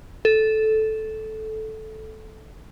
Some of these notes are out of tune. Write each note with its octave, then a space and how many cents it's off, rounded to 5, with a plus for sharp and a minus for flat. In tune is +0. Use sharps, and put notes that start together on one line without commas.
A4 -10